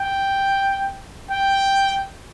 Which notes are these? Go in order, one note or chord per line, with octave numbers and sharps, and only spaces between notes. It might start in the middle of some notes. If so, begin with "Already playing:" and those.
Already playing: G5
G5